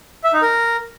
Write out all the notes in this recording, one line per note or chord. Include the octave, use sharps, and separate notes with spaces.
E5
D#4
A#4